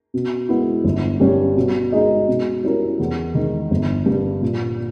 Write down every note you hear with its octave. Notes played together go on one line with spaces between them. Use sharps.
B2
G#3 B3 E4
G1
G2 G3 C#4 G4
B2
G#3 D#4 G#4 D#5
B2
G3 C#4 E4 A#4
E2
D#3 G#3
G1
G2 G3
A#2